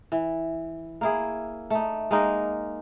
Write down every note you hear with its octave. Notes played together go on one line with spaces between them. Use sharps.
E3
A#3 E4 G#4
A3 D#4
G#3 A#3 D#4